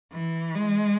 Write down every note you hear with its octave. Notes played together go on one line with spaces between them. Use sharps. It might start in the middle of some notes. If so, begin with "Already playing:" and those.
E3
G#3